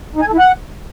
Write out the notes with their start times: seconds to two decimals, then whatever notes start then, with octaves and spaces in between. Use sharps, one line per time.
0.16 D#4
0.22 G#5
0.27 A4
0.33 E4
0.39 F#5